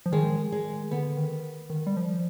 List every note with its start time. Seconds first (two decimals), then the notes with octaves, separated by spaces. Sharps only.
0.06 F3
0.12 D#3 G#3
0.52 G#3
0.91 D3 B3
1.17 D#3
1.70 D#3
1.87 G3
1.97 F3